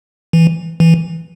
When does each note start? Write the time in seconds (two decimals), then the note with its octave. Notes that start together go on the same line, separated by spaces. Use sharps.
0.33 E3
0.80 E3